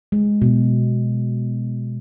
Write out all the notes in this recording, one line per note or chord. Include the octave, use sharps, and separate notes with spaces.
G#3
B2